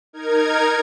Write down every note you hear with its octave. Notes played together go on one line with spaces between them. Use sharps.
D#4 A#4 G#6